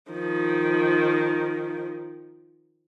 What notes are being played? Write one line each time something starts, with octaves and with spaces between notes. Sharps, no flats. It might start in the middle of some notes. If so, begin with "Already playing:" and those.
D#3 F3